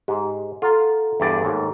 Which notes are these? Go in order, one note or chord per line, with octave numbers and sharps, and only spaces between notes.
G#2 G4
F4 A4 F#5 A#5
E2 G2 D5
D#2 G#2